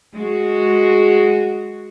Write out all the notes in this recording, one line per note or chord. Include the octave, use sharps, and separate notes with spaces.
G#3 F#4